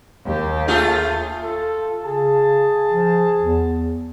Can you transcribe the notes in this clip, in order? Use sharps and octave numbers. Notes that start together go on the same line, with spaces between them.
D#2 G4
A3 F4 G#4
F4 A4
C#3 G#4 A5
F3
E2